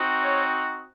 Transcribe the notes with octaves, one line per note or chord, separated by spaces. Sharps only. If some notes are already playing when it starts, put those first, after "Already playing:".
Already playing: C4 D#4 F#4
C#5